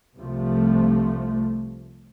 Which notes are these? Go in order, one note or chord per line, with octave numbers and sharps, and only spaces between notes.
C2 C3 F3 A3